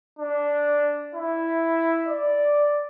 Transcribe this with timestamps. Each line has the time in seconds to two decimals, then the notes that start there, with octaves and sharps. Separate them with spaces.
0.19 D4
1.15 E4
2.07 D5